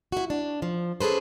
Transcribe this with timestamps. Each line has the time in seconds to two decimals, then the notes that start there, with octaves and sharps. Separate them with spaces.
0.12 E4 F#4
0.30 D4
0.62 F3
1.00 C#4 G#4 A4 B4 C5